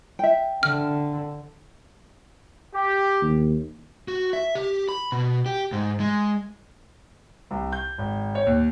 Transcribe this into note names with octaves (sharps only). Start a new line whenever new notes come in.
E5 G5
D3 F6
G4
D#2
F#4
E5
G4
B5
B2
G4
G#2
G#3
C2
G6
G#1
C#5
D#2